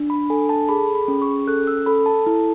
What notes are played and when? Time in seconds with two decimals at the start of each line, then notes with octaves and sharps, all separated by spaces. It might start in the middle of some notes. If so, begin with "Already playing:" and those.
Already playing: D4
0.10 B5
0.30 A4 G#5
0.49 A5
0.69 G#4 B5
0.95 B5
1.08 C#4
1.22 C#6
1.47 A4 F#6
1.67 E6
1.86 A4 B5
2.06 A5
2.27 E4